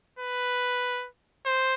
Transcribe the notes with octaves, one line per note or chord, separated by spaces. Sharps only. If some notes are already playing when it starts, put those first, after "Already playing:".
B4
C5